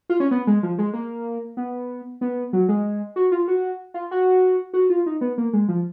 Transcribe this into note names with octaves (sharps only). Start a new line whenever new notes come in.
F4
C#4
B3
G#3
F3
G#3
A#3
B3
B3
F#3
G#3
F#4
F4
F#4
F4
F#4
F#4
F4
D#4
B3
A#3
G#3
F3